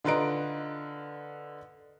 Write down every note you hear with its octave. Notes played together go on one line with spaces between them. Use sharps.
D3 F4 B4 D#5 A#5 D7